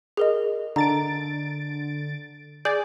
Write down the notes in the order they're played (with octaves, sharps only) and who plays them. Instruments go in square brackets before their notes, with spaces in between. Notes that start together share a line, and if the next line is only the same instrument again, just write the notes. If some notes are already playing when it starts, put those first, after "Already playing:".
[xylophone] G#4 A#4 D#5
[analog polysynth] D3 A6 D7 [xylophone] A#5
[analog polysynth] G#4 D5 [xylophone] G6 A6